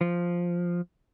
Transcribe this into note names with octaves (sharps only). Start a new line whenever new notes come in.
F3